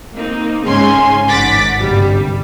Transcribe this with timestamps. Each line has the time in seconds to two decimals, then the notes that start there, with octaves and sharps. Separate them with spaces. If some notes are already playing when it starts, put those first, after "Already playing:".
0.14 A#3 C4 D#4
0.64 G#2 C#3 G#3 C#4 G#5 C6
1.28 G#1 D#3 F#5 D6 A6 B6
1.77 G1 C2 G3